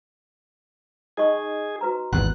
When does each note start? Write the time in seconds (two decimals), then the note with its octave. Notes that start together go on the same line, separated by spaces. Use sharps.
1.17 D#4 G#4 D#5 C#6
1.81 F#4 B4 A#5
2.13 G#1 E2 F#5 F#6